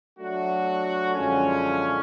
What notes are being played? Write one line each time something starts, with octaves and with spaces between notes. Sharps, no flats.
F#3 A3 D4 F#4
F#2 D3 F3 G#3 C#4